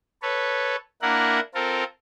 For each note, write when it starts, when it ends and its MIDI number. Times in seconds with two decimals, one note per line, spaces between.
0.22 0.76 69
0.22 0.76 71
0.22 0.76 73
1.02 1.40 58
1.02 1.40 62
1.02 1.40 64
1.02 1.40 70
1.02 1.40 78
1.54 1.84 60
1.54 1.84 65
1.54 1.84 69
1.54 1.84 70